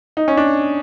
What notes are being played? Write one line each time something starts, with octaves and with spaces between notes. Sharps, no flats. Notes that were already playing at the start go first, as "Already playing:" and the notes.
D#4
C#4
D4